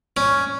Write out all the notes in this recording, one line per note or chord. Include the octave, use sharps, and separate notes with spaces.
C#4